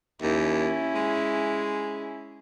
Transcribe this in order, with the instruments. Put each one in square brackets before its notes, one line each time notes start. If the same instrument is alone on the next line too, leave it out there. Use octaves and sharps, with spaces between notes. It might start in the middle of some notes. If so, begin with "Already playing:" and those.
[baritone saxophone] D#2 [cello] C#4 E4
[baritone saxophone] G#3